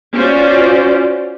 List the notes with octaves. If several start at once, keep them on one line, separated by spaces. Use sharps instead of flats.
C#4 F4 F#4 C5 D5